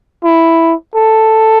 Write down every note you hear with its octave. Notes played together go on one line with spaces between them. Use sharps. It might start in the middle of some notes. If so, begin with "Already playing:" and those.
E4
A4